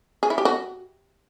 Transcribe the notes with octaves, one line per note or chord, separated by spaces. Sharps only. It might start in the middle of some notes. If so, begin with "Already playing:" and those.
G#4
E4
G4
F#4